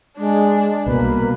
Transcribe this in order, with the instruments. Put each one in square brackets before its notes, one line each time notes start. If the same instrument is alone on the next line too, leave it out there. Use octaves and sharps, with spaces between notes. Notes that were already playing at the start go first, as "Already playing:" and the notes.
[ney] G#3 [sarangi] D4
[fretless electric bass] C2 B2 [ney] A#3 [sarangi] B4